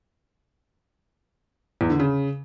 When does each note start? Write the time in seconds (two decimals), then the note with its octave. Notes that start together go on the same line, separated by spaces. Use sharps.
1.81 E2
1.90 D3
1.99 C#3